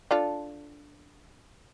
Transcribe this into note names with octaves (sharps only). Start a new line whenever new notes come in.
D4 F4 A4